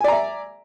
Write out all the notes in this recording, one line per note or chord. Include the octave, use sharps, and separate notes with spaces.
D5 E5 G#5 A#5